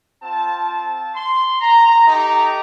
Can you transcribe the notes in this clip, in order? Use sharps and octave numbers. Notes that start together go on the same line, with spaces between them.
C4 F4 A5
A5
C6
A#5
A3 D#4 G4 A#5